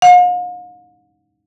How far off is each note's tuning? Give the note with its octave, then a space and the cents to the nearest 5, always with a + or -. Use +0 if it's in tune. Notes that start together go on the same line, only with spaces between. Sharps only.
F5 +45